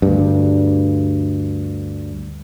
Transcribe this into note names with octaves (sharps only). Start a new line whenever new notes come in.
D2 G2